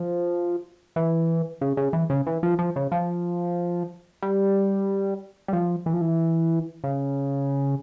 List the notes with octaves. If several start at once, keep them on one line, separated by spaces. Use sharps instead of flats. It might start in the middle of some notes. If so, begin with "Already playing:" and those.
Already playing: F3
E3
C#3
C#3
E3
C#3
E3
F3
F3
C#3
F3
G3
G3
F3
E3
F3
E3
C#3